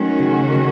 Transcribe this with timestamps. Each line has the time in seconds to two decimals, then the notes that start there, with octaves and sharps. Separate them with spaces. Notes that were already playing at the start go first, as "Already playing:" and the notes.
Already playing: D#3 F#3 A3 C#4 F#4
0.19 C#3
0.54 C#3